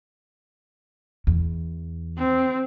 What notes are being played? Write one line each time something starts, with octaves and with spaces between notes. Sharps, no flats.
E2
C4